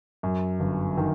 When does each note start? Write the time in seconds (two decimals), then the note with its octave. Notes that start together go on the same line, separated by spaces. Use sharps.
0.23 F#2
0.60 G1
0.97 D#3